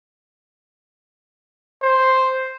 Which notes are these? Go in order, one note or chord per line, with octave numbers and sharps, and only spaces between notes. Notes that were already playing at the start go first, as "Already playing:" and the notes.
C5